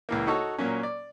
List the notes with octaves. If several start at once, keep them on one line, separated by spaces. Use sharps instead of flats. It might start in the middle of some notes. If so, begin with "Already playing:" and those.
C#2 E3 A#3
D#4 F#4 A4 C#5
A#2 F#3 A#3 C#4
D5